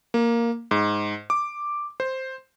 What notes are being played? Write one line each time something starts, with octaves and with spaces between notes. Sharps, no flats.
A#3
G#2
D6
C5